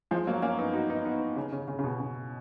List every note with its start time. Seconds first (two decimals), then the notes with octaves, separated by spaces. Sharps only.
0.11 F3 G#3
0.27 F#3 A#3
0.42 A#3 C#4
0.59 B3 D#4
0.74 D#4 F#4
0.90 B3 D#4
1.05 B3 D#4
1.36 C#3
1.52 C#3
1.68 C#3
1.79 C#3
1.84 B2
2.00 C#3